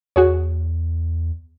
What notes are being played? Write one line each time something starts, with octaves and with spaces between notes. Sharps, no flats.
E2 F#4 G#4 C#5